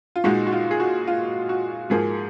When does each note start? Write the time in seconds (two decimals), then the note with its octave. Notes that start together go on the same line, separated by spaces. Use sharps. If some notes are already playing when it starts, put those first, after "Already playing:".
0.16 F4
0.24 A#2 G#3 D#4 F#4
0.47 F#4
0.52 F4
0.71 G#4
0.80 F#4
1.07 F4
1.49 F#4
1.90 G#2 F3 A#3 G#4